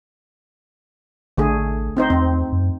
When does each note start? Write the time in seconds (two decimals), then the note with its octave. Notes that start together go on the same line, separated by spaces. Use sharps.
1.37 A1 D3 A3 G#4
1.97 C4 D#4 C5
2.10 E2 C4
2.52 F#2